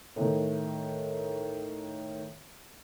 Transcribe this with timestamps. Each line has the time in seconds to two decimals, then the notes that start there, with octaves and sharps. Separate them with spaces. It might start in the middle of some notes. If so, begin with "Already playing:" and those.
0.16 A2 D#3